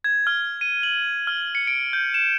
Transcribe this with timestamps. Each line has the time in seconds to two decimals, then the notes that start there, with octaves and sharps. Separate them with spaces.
0.04 G#6
0.27 F6
0.61 D#7
0.83 F#7
1.27 F6
1.55 C#7
1.67 D7
1.93 G6
2.14 E7